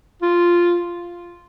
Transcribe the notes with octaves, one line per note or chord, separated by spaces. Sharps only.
F4